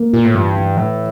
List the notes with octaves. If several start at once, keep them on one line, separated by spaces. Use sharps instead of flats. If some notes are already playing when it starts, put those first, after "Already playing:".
Already playing: A#3
A#2 F4
A2
G2 E3
E3
A2 E3